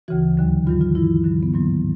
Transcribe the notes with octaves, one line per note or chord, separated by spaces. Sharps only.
D2 C#3 E3 F#4
D#2 D3 F#3
G2 D#3 F#3 F4
F4
G2 E3 E4
G2 D3 F#3
B3
G#2 D#3 F#3 A#3